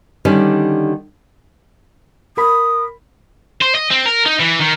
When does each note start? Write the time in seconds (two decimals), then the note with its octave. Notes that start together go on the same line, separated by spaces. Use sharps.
0.25 D3 D#3 G3 C#4
2.37 A#4 B5 D#6
3.62 C5
3.75 D#5
3.91 C4
4.06 A#4
4.26 D#4
4.40 E3
4.61 D#3